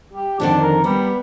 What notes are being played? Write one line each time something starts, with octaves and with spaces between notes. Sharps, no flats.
G4
F2 D3 D#3 D4
A#4
G3 B3